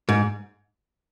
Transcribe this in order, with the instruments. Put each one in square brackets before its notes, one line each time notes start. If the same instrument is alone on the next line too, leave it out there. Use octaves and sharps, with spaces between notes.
[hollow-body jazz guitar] G#2